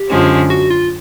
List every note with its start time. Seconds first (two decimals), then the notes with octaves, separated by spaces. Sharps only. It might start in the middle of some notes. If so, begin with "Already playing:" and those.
Already playing: G4
0.09 F#2 D3 F3 G#3 C#4
0.50 F#4
0.70 F4